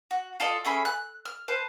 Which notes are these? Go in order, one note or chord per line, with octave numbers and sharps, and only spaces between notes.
F#4
F4 A4 D5 D#5
A3 C#4 G#4 B5
F#6
F6
B4 C5 A5